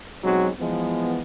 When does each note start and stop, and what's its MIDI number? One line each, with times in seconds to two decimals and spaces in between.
0.23 0.49 35
0.23 0.49 54
0.23 0.49 56
0.23 0.49 60
0.23 0.49 66
0.60 1.22 52
0.60 1.22 53
0.60 1.22 56
0.60 1.22 59